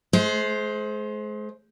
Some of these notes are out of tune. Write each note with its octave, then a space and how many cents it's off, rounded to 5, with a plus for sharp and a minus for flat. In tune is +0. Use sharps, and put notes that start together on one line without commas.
G#3 +40 C5 +0